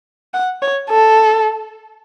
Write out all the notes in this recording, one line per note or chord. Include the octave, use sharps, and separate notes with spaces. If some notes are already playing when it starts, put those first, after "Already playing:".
F#5
C#5
A4